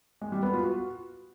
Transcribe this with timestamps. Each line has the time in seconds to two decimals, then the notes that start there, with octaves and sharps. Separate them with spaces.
0.21 G#3
0.32 G3
0.43 B3
0.53 F4
0.64 F#4